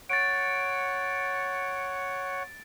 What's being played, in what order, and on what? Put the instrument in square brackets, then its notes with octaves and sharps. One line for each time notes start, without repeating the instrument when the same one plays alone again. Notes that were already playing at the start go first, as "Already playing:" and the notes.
[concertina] C#5 F#5 [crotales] A6 D7